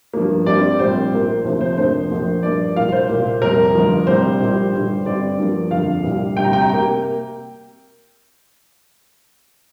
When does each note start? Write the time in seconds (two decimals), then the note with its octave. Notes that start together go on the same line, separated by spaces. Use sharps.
0.13 G2 F3 A#3
0.46 G2 G3 C4 D5
0.79 A#1 A#2 G3 C4 C5
1.13 A#1 A#2 A#3
1.45 D2 C3 F3 A#3 C5
1.61 C5
1.77 F1 F2 D3 F3 A#3 C5
2.10 A#1 A#2 F3 A#3
2.43 G2 F3 A#3 D5
2.76 C2 A#2 A#3 F5
2.92 C5
3.09 C2 A#2 A#3
3.42 F2 C3 G3 A#3 A#4
3.74 G1 G2 F3
4.07 C2 A#2 G3 C4 C5
4.40 A#1 A#2 G3
4.73 G2 D3 G3
5.05 G2 D3 G3 C4 D5
5.39 G2 F3 A#3
5.71 G1 F2 D3 F3 F5
6.04 C2 A#2 G3 A#3
6.36 D2 C3 G3 C4 G5
6.44 A#5
6.53 G5
6.61 A#5
6.69 C3 A#3 G5